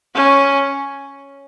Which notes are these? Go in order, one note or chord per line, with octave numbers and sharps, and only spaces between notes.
C#4